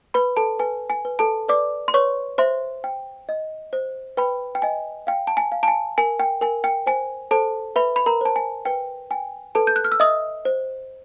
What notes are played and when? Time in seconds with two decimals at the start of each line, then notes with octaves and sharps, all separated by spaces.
0.14 B4 B5
0.37 A4 A5
0.59 B4 G#5
0.90 G#5
1.05 B4
1.19 A4 A5
1.49 B4 D5 D6
1.88 C6
1.94 B4 C#5 C#6
2.38 C5 E5 C6
2.84 G5
3.29 D#5
3.73 C5
4.17 B4 G5 B5
4.55 G5
4.62 D#5 G#5
5.07 F5 G5
5.27 A5
5.37 G#5
5.52 F5
5.63 A5
5.68 G#5
5.98 A#4 G#5
6.20 G5
6.41 A#4 G#5
6.64 G5
6.86 C5 G#5
7.31 A4 C5 A5
7.76 B4 E5 B5
7.96 B5
8.06 A#4 A#5
8.21 C5 A5
8.36 G#5
8.65 B4 G5
9.11 G5 G#5
9.55 A4 B4 A5
9.67 G6
9.76 F#6
9.85 F6
9.92 E6
10.00 D#5 E5 D#6
10.45 C5